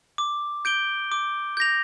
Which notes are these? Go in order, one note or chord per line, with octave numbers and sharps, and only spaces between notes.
D6
G6 D7 G7
D6
G6 A#6 F7